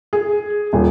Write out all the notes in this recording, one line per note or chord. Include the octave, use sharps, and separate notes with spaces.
G#4
D#1